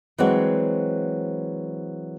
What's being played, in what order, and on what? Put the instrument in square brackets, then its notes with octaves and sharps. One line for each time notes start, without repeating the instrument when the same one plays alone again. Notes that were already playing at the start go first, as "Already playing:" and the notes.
[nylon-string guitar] E3 F#3 G#3 C4 C#5 F#5